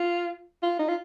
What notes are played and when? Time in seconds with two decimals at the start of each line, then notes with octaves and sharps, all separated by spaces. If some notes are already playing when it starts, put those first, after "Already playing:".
Already playing: F4
0.63 F4
0.79 D#4
0.88 F4